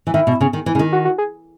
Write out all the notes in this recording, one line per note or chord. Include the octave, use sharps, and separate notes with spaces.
E3
D#3 E4
B2
C#3
D#3
E3
C#3
D#3
F#4
F#4
G#4